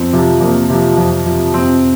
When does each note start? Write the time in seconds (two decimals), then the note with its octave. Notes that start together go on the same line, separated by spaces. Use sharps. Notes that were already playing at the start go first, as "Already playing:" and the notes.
Already playing: F2 C4
0.13 C3 F3
0.41 F2 A#3
0.70 C3 F3
0.97 F2
1.26 C3 F3
1.54 F2 C4